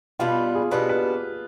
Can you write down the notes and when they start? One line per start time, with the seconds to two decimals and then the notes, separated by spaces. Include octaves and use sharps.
0.19 B2 G3 B3 D4 F4
0.55 G#4
0.71 B2 G3 B3 D4 B4
0.89 B4